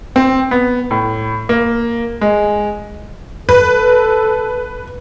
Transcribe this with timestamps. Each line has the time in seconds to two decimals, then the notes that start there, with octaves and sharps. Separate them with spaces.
0.16 C4
0.51 B3
0.91 A2
1.49 A#3
2.21 G#3
3.49 A4 B4